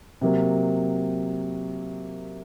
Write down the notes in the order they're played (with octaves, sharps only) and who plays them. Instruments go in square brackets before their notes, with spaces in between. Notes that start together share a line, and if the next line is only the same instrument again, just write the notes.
[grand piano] C3 F#3 A#3